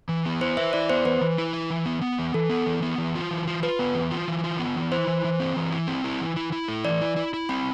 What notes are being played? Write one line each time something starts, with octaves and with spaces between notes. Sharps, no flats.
E3
B3
E4 C5
B4 E5
E4 D5
B3 C5
E3 B4
E3
E4
B4
E3
B3
B3
E3
E3 A4
B3
E3
B3
E3
F4
E3
F4
F4 B4
B3
E3
F4
E3
F4
B3
E3
E4 C5
E3
E3
C4
E3
E4
C4
E4
E3
E4
E4
A3
E3 D5
E4
E4
E4
C4 B5